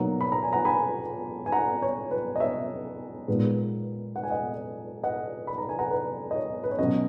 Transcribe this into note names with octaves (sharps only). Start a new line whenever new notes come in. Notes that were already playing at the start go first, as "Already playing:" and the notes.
Already playing: B2 F#3 A#3 D#4 F#5 A#5
B5
A#5
G#5
F#5 A#5
G#5 B5
G#5
F#5 A#5
C#5
B4
D#5
C#5 E5
A#2 G#3 B3 D#4
F#5
G#5
D#5 F#5
D#5 F#5
B5
A#5
G#5
F#5 A#5
B4
D#5
C#5
B4
C#5
B2 F#3 C#4 B4 D#5